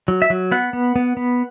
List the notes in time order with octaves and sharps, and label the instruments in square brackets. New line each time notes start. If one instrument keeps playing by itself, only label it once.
[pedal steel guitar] F#3
E5
F#3
B3 F#5
B3
B3
B3